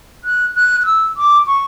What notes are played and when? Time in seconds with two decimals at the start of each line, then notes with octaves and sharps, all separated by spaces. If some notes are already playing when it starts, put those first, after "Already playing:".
0.24 F#6
0.55 F#6
0.82 F#6
0.85 E6
1.17 D6
1.47 C#6